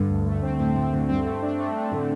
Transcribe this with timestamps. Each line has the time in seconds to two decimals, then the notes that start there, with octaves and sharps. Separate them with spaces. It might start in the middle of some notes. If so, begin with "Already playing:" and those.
Already playing: G2 D3
0.09 D2
0.26 A3
0.42 C4
0.59 A2 C4
0.75 A2 C4
0.93 A2 D3
1.09 G2 C4
1.25 A3
1.42 D4
1.59 A3
1.76 A3
1.91 A2 D3